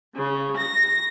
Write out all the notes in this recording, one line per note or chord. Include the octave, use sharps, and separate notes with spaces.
C#3
A#6